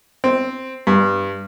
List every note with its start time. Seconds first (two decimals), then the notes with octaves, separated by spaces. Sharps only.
0.24 C4
0.87 G2